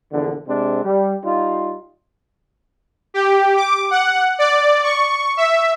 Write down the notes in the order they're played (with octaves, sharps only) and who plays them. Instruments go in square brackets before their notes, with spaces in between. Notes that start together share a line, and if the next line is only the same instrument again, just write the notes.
[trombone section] A#1 E2 D3
C3 G#3 C4 D4
G3
G3 D#4 F4
[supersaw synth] G4
D6
F#5
D5
C#6
E5